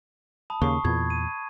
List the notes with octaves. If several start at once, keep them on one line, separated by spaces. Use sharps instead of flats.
A5 B5 D#6
D#2 C#3 A#3 C#6 D#6 C7
E2 A#2 B5 G#6
D#7